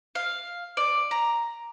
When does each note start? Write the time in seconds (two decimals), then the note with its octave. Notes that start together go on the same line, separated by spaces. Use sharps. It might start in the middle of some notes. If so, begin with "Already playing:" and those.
0.15 F5
0.77 D5
1.11 A#5